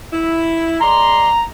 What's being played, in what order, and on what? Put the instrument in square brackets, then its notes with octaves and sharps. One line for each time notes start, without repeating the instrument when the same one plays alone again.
[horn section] E4
[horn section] G#3 D5 C6 [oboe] A#5